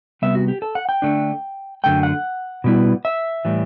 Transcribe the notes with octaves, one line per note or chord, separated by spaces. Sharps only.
C3 G3 B3 E5
F#4
G4
A4
F#5
G5
D3 A3 D4
F#2 D3 A3 G5
F#5
B2 G3 B3 E4
E5
A2 E3 G3